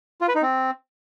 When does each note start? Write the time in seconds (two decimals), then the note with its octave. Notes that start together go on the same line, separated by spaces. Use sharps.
0.21 F4
0.28 B4
0.35 D#4
0.42 C4